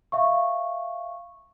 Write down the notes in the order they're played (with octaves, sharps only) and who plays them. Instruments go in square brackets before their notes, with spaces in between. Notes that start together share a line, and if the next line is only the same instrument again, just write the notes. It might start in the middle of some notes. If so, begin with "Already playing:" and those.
[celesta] E5 F5 C#6